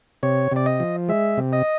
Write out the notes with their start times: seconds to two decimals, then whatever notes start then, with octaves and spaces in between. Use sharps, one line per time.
0.23 C3 C#5
0.52 C3 D5
0.66 D#5
0.80 F3
1.09 G#3 E5
1.37 C3
1.53 D#5